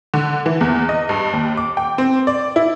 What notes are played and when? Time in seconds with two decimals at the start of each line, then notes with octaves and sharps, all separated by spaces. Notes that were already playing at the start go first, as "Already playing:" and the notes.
0.14 D3
0.46 E3
0.61 E2
0.89 D#5
1.09 G2
1.33 D#2
1.57 D6
1.77 G5
1.98 C4
2.27 D5
2.56 E4